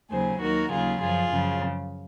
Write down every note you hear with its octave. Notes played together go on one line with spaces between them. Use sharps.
D#2 C#3 F#3 G#4 C5
D#2 D#3 F#3 F#4 A#4
D#2 C#3 F#3 F4 G#4
F#2 F3 F4 G#4
F#2 C#3 F3